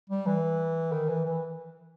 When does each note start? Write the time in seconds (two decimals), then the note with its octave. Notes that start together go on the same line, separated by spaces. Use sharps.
0.09 G3
0.26 E3
0.92 D#3
1.09 E3
1.25 E3